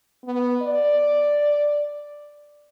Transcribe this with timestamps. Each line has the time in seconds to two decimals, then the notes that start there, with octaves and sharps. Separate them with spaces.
0.24 B3
0.62 D5